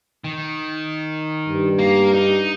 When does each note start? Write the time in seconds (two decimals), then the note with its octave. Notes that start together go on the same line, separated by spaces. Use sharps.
0.24 D#3
1.48 G2
1.79 A#3
2.13 D#4